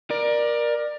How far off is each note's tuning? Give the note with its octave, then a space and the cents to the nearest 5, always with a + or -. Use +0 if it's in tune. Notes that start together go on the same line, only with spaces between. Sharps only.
A#4 +20 D5 +20